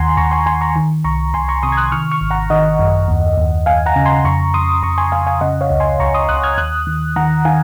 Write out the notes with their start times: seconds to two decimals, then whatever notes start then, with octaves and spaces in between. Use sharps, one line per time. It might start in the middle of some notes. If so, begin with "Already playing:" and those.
Already playing: D#2 D#3 F#5 G#5 A#5 C6
0.17 D#2 A#5 C#6
0.31 G#5 C6
0.46 D#2 G#5 C6
0.61 A#5 C#6
0.76 D#3
1.04 C2 A#5 C#6
1.34 C2 G#5 C6
1.48 A#5 C#6
1.62 C3 C6 D#6
1.72 G#6
1.77 D#6 F#6
1.92 D#3 C#6 F6
2.12 C#6 F6
2.21 G#1
2.31 F#5 A#5
2.50 D#3 D#5 F#5
2.79 F#2
3.08 D#2
3.37 D#2
3.66 D#2 F5 G#5
3.86 F#5 A#5
3.96 C#3
4.05 G#5 C6
4.24 F2 A#5 C#6
4.54 F2 C6 D#6
4.83 F2 A#5 C#6
4.98 G#5 C6
5.12 F2 F5 G#5
5.27 F5 G#5
5.41 C#3 D#5 F#5
5.61 C#5 F5
5.70 C#2
5.80 G#5 C6
6.00 C#2 A#5 C#6
6.14 C6 D#6
6.29 C#2 D#6 F#6
6.43 F6 G#6
6.58 D#2 D#6 F#6
6.87 D#3
7.16 D#3 F#5 A#5
7.45 D#3 F5 G#5